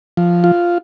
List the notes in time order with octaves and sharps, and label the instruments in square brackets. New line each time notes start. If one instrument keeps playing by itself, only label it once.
[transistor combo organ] F3
F4